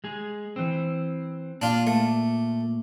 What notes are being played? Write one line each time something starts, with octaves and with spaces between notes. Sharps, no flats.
G#3 G#4
E3 C4
A#2 D4 F4
A3